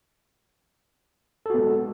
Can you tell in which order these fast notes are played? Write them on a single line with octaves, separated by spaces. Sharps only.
A4 F#4 B3 G#3